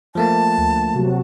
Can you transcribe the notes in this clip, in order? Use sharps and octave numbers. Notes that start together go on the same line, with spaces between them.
F3 A3 A#3 A5
D2
C3 F#3 F#4